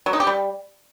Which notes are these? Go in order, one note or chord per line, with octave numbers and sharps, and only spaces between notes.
F#3
D#4
G4
G3